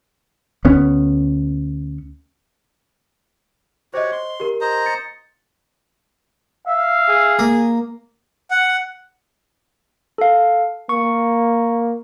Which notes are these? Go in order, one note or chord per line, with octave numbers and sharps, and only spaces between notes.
D2 B3 C#4
F#4 G4 C5 C#5 D#5
C6
G4 A#4
C5 D#5 A#5
A6 C#7
E5 F5
G#4
A#3
F#5
A4 F5
A#3 C#6